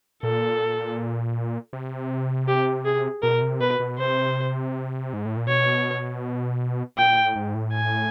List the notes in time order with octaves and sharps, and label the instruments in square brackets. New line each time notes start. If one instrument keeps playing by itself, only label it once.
[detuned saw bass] A#2 [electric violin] A4
[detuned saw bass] C3
[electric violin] G4
G#4
[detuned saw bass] B2 [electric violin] A#4
[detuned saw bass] C3
[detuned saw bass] B2 [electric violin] B4
[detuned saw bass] B2
[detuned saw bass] C3 [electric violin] C5
[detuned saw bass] G#2
A2
A#2
[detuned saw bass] B2 [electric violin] C#5
[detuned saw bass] A#2 [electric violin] G5
[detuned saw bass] A2
G#2
A2
[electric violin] G#5